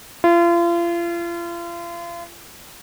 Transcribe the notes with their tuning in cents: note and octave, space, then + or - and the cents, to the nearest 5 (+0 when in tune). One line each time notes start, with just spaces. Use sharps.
F4 -35